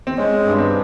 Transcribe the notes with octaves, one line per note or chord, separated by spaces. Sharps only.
C4
G#3 C#4
G2
C4